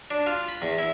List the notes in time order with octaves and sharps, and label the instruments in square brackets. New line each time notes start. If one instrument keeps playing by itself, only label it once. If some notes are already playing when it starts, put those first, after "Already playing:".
[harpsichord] D4
F4
B5
E2
E4